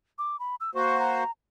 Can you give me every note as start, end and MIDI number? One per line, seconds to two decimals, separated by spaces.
0.18 0.39 86
0.40 0.55 83
0.60 0.70 88
0.75 1.24 58
0.75 1.24 66
0.75 1.24 72
0.75 0.98 85
1.00 1.31 82